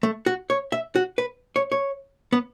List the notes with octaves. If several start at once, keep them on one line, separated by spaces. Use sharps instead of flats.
A3
F#4
C#5
E5
F#4
B4
C#5
C#5
B3